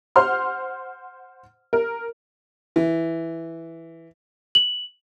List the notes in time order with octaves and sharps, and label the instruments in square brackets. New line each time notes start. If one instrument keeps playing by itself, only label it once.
[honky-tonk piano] C5 F#5 C6 F6
A#4
[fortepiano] E3
[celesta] F#7